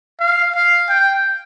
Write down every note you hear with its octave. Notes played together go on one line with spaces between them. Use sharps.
F5
F5
G5